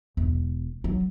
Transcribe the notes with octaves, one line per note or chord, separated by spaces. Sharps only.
E1
F#3